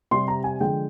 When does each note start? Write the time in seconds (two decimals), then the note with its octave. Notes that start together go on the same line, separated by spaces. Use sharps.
0.11 C3 G3 C6
0.28 A#5
0.44 G#5
0.60 D3 F3 G#3 G5